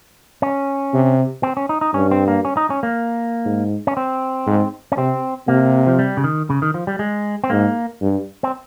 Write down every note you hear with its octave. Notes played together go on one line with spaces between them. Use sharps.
C#4
C3
C4
C#4
D#4
D#4
G2 C#4
C4
A#3
C#4
D#4
C#4
A#3
G#2
C#4
C4
G#2
C#4
C3 C4
C3 A#3
F3
G3
C#3
D#3
C#3
D#3
F3
G3
G#3
C4
G#2 A#3
G2
C4